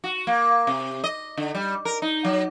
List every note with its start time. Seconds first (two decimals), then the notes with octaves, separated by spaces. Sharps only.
0.04 F#4
0.27 A#3
0.67 C3
1.04 D#5
1.37 D3
1.55 G3
1.85 A#4
2.02 D#4
2.25 F#3